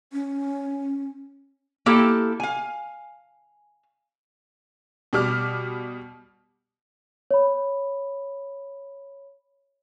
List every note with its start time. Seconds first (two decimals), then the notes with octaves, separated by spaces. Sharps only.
0.13 C#4
1.86 A#3 E4 G4 A4
2.40 F5 G#5
5.13 B2 G3 D6 F6
7.31 C#5 B5